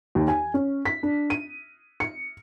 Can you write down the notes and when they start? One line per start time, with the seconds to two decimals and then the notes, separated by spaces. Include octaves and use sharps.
0.15 D#2
0.28 G#5
0.54 C#4
0.85 B6
1.03 D4
1.30 D#7
2.00 C#7